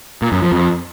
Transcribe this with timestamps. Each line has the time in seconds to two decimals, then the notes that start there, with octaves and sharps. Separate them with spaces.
0.22 A#2
0.32 F#2
0.42 F3
0.52 F2